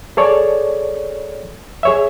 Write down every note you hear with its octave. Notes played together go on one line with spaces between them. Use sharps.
G#4 A4 C#5 D5
G#4 C#5 E5